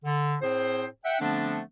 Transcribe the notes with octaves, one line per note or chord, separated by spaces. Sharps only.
D3
A2 C4 G#4 C5
E5 F#5 G5
D3 F3 A3 B3 C4 D4